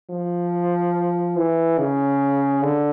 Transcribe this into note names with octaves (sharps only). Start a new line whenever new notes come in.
F3
E3
C#3
D3